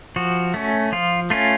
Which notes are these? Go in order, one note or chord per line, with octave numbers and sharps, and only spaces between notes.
F3 F#4
A3 C#4
F3 F4
A3 C#4 F4